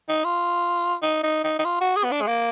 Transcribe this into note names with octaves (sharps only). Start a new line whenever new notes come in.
D#4
F4
D#4
D#4
D#4
D#4
F4
F#4
G#4
B3
D4
G#3
A#3